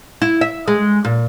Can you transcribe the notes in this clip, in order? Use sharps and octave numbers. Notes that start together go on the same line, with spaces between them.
E4
E5
G#3
A#2